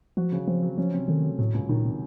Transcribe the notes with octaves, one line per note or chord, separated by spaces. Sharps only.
F3 F#4
C#3
F3 C4
F#3
F3 C#4
C3
D#3 A3
F#3
A2 F#3
C#2
A#2 D#3
C3